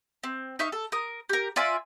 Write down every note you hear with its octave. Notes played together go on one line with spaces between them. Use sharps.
C4
D#4 E5 F5 C#6
A4
A#4 D#6
G4 A#4
F4 D5 E5 G#5